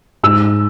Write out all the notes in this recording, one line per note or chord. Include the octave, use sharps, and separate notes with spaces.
G#2 E6